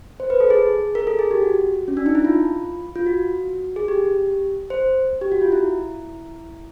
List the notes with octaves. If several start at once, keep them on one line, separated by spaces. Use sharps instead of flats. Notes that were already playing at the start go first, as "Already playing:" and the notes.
C5
B4
A4
G#4
A#4
A4
G#4
G4
F#4
C#4
D4
D#4
E4
F4
F4
F#4
G#4
G4
C5
G4
F#4
F4
E4